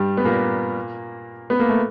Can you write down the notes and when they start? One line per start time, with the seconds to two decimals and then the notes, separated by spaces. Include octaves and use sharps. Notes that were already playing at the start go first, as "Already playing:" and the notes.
Already playing: G2 G3
0.17 B3
0.25 A#2 A#3
1.50 B3
1.60 A#3
1.69 A3